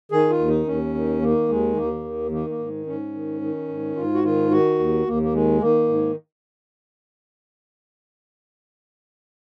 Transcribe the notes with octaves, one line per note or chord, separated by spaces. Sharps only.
D#3 G#4
F4
D#2
D#4
D#2 C#4
D#3
D#3 A#3
D#2 G#3
D#2 A#3
D#3
D#3 A#3
A#3
G#2
G#2 C#4
D#3
D#3
G#2
G#2 F4
F#4
D#3 F4
D#3 F#4
D#2
D#2 A#3
A#3
D#3 G#3
D#3 A#3
G#2